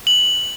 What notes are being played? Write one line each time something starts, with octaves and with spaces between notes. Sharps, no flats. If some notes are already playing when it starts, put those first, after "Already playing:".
F#7